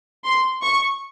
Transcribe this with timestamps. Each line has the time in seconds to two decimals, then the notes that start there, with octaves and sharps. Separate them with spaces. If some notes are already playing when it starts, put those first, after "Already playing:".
0.25 C6
0.62 C#6